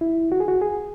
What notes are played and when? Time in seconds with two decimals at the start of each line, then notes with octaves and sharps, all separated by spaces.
0.01 E4
0.32 F#4
0.40 G#4
0.48 F#4
0.62 G#4